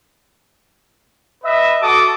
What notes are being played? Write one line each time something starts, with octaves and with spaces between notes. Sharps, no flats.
B4 D#5 E5
F#4 A4 A5 D6 D#6